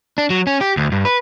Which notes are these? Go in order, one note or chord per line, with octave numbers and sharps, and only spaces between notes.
D4
F#3
C#4
G4
D2
G2
B4